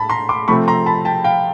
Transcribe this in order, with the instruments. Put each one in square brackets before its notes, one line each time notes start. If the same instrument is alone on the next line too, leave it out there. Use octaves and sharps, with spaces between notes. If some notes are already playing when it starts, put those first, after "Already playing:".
Already playing: [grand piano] A2 A5 B5
A#5 C6
C6 D6
C3 F3 A3 C4 B5 C#6
A#5 C6
A5 B5
G5 A5
F5 G5